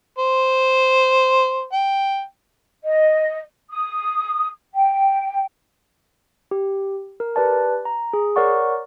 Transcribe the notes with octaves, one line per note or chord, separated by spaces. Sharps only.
C5
G5
D#5
D#6
G5
G4
A#4
G4 B4 D5 A5
A#5
G#4
A#4 C#5 D5 F#5 C#6